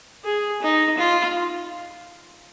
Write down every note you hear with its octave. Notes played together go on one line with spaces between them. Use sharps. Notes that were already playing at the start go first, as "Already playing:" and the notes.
G#4
D#4
F4